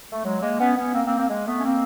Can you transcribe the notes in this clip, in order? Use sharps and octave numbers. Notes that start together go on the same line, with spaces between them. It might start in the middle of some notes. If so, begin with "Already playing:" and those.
A3
F#3 G#3
G#3 A#3
B3 C#4
B3 C#4
A#3 C4
A#3 C4
A#3 C4
G#3 A#3
A3 B3
C#4
A#3 C4